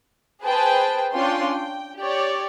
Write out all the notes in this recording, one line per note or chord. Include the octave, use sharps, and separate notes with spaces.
G#4 B4 C5 G5 A5
C#4 D4 F4 G5 C6
G5
G4 C#5 D5